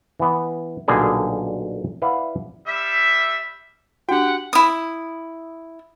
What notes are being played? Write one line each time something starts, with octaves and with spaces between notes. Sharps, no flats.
E3 B3
B1 A#2 D3 G3 G#4 A#4
E4 B4 D5 F5 F#5
G3 E5
D4 F#4 G4 F#5 G5
E4 D#6